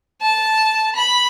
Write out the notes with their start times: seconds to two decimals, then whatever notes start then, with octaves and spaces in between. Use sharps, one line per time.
0.22 A5
0.96 B5